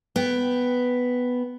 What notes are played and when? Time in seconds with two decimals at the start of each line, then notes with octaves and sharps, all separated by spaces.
0.16 B3 G5